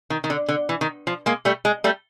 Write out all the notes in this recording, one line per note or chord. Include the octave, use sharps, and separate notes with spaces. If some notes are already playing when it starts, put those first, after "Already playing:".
D#3
D#3
D3
D3
E3
D#3
F3
G#3 A#3
G3 A3
G#3
G3 A3